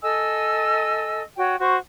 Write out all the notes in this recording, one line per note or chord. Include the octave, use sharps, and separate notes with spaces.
A4 D#5 G#5 E6
F#4 C#5 G5
F#4 C5 C#6